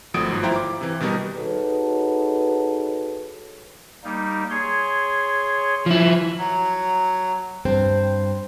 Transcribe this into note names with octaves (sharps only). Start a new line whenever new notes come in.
G#1 F3 F#3 A3 D#6 D7
G1 G#2 F3
E4 F4 C5 F5 G5 A#5
D6
C3 E3
B2 D#3 G3 B3 D#4
D#4 F#4 G#4 A4 B4 C#5
G3 A#3 D#4
G#4 C#5 C6
F3 E4
F#3
G2 C4 C5